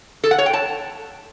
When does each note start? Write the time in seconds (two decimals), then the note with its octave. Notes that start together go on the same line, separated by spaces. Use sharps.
0.24 A4
0.31 F#5
0.38 C#5
0.46 G5
0.53 A5